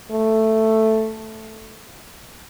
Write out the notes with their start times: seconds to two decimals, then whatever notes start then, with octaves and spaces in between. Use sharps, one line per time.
0.11 A3